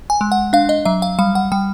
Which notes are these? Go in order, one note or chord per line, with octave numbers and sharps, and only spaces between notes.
G#5
G#3
F#5
D4 F5
D#5
F#3 E5
F5
G3 F5
F#5
G3 G5